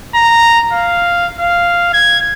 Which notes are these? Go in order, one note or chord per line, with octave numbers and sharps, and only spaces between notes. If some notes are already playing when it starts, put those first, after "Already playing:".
A#5
F5
F5
G#6